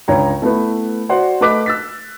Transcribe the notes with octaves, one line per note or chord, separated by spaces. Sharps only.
C#2 D4 C#5 G5 A#5
A3 B3 E4 B4
F#4 C5 D5 F#5
A3 B4 D#5 D6 F#6 B6
E6 A6 B6